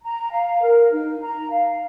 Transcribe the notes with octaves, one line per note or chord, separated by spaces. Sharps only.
A#5
F5
A#4
D#4
A#5
F5